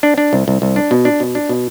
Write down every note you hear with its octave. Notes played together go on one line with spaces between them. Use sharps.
D4
D4
C2
C2
C2
D4
B2
D4
B2
D4
B2